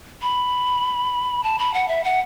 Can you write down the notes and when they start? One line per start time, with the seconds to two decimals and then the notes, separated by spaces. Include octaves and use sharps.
0.22 B5
1.43 A5
1.59 B5
1.74 F#5
1.88 E5
2.04 F#5